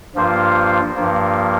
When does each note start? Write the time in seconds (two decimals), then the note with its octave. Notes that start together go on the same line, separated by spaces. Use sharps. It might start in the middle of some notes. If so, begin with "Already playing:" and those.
0.15 G2 F3 A#3 F4 C5
0.96 G2 F3 A#3